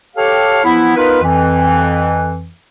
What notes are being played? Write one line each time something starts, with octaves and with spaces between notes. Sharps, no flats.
G4 A4 C#5 F5
F3 B3 E4
B3 D#4 F4 A#4 B4
F2 E3